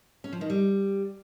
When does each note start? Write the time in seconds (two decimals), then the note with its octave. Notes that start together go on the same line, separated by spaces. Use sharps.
0.24 C#4
0.33 F3
0.41 D#3
0.50 G3